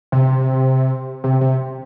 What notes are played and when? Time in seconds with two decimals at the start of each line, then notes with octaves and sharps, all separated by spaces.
0.12 C3
1.24 C3
1.41 C3